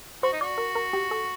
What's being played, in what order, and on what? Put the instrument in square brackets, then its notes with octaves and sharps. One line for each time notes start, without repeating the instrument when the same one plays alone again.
[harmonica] F#4 [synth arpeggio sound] C5
[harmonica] D#4
[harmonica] F#4 [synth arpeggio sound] D5
[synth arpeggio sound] A#4
A#4
G4
A4